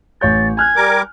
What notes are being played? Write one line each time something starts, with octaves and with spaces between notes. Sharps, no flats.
A1 C#5 G6 A6
G#5 F6 F#6 G#6
G3 A#4 D6